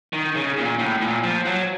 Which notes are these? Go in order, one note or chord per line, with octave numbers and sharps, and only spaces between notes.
D#3
C#3
A#2
A2
A#2
F3
F#3